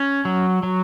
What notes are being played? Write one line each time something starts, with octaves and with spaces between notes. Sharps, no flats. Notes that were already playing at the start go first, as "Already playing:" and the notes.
Already playing: C#4
F#3
F#3